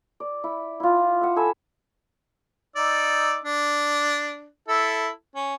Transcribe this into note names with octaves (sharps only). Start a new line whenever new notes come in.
D5
E4
E4 F4
E5 F#5
A4 G#5 B5 E6
D#4 D5 E6
D4
E4 A4
C#4